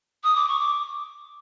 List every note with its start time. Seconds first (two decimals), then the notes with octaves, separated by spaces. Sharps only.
0.24 D#6
0.35 D6
0.48 C#6
0.59 D6